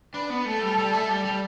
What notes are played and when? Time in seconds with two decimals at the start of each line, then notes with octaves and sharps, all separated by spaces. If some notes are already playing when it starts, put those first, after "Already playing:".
0.14 D4 B4
0.30 B3
0.45 A3 A4
0.61 G3
0.78 G3
0.93 A3
1.09 G3
1.25 G3